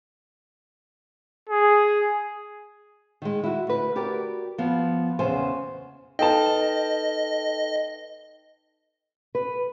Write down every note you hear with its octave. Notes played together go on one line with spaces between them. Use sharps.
G#4
D#3 G#3
E4 F#4
D2 B4
F#4 G4 A#4 D5
F3 B3
E2 C#3 B3 C5 G#5
D#4 A4 B4 D#5 G5 A5
B4